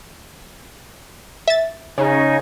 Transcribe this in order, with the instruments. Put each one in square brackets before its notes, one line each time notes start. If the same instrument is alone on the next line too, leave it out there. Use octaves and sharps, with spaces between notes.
[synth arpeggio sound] E5 A6
[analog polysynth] C#3 [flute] D#4 [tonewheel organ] C#5 G#5